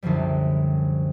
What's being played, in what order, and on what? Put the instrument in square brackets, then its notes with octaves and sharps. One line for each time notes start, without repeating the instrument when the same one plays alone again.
[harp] C2 F#2 D3 F3 G3